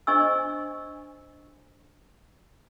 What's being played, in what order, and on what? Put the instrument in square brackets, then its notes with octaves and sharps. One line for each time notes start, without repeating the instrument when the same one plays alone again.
[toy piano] D4 C5 D#5 G#5 C#6 E6